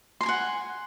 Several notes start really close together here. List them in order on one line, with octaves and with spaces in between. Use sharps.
C6 A#5 G#5 F#5